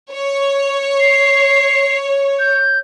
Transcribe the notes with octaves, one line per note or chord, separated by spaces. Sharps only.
C#5
C7
G6